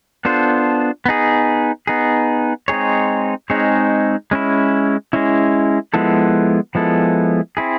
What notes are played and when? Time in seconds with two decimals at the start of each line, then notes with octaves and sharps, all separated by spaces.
0.25 B3 D4 F4 A4 C5
1.06 B3 D#4 G#4
1.87 B3 D#4 G#4
2.68 G#3 C4 D#4 G#4 C#5
3.50 G#3 C4 D#4 G#4 C#5
4.31 G#3 C#4 E4
5.13 G#3 C#4 E4
5.94 F3 G#3 B3 E4 A4
6.75 F3 G#3 B3 E4 A4
7.57 C4 E4 G#4